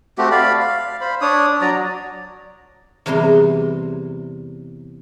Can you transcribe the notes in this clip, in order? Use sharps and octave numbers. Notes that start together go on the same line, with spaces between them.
A3 C4 F#4 G4
D5 F5 B5
F5
C5 B5
D4 C#5 D#6
F#3 D5 A#5
E2 C3 G3 A#4 C5